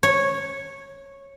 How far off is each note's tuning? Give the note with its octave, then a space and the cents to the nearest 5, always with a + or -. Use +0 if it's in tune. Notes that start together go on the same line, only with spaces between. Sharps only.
C#5 -10